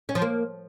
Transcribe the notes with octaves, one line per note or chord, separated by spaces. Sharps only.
C#4
F3
A#3